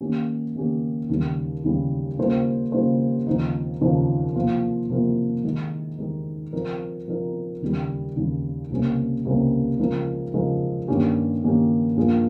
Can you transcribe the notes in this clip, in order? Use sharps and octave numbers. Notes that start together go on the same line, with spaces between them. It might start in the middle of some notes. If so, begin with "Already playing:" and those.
D#3 A#3 C#4 G4
D#3 A#3 C#4 G4
D#2 C#3 G3
D#2 C#3 G3
C#3 G3 A#3 F4 C5
C#3 G3 A#3 F4 C5
D#2 C#3 F3 C4 D#4
D#2 C#3 F3 C4 D#4
C3 F3 A#3 F4
C3 F3 A#3 F4
D#3 G#3 D#4
D#3 G#3 D#4
F3 C4 D#4 A#4
F3 C4 D#4 A#4
D#2 C#3 G3
D#2 C#3 G3
C#2 C3 G3 A#3 C#4
C#2 C3 G3 A#3 C#4
C#3 F3 G#3 D#4 A#4
C#3 F3 G#3 D#4 A#4
G2 D#3 A#3 C#4 G4
G2 D#3 A#3 C#4 G4
G2 F3 A#3 F4 G#4